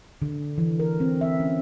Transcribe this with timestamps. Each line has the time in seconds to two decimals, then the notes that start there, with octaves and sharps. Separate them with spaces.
0.22 D3
0.58 E3
0.80 A#4
1.00 C4
1.21 E5
1.40 C#4